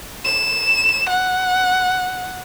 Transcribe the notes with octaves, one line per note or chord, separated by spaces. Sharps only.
E7
F#5